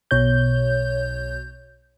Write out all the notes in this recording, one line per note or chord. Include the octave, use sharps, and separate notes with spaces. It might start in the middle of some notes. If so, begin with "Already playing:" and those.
B1 B2 C#5 G6